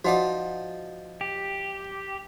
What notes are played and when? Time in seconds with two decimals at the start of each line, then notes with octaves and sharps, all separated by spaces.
0.05 F3 D#4 F#4 D5 F#5
1.21 G4